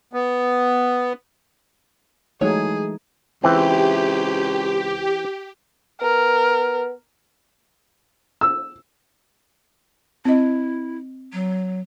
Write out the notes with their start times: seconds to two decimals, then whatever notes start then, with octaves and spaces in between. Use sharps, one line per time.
0.13 B3
2.41 E3 F#3 G#3 A3 D#4 G#4 C#5
3.44 C#2 E3 C4 G4
6.02 B3 A#4
8.41 E6
10.25 C4 E4 D#5
11.33 F#3